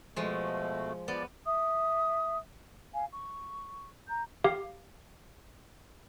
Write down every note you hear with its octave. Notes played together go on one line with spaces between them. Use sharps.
B2 F3 G#3 A3
F3 B3 D5
E5 D#6
F5 G#5
C#6
A#5 G6
G4 F5